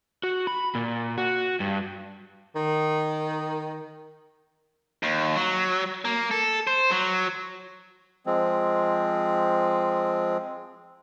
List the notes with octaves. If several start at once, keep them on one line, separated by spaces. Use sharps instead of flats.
F#4
B5
A#2
F#4
G2
D#3
D#2
F#3
A#3
A4
C5
F#3
F3 G#3 C4